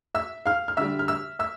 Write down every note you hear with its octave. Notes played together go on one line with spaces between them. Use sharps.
E5 E6
F5 F6
F6
D3 G3 E5 E6
F6
E5 E6
E5 E6